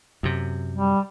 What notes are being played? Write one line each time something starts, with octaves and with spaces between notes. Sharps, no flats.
F#2 C3
G3